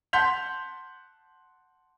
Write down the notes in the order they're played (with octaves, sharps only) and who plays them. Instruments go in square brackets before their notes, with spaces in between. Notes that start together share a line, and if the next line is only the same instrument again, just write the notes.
[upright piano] F#5 A5 C6 G6 B6 F7